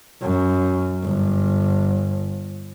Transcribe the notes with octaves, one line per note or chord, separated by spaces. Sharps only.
F#2
G1